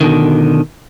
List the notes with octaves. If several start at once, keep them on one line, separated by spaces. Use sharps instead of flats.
B2 D3 D#3